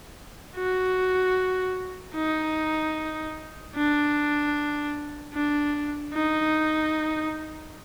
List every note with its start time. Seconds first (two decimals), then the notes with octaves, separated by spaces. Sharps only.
0.55 F#4
2.15 D#4
3.75 D4
5.34 D4
6.14 D#4